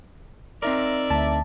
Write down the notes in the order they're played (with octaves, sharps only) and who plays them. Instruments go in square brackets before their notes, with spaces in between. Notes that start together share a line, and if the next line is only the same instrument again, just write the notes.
[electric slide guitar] C4 D#4 A#4 [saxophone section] D5 E5
[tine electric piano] D2 [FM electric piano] A5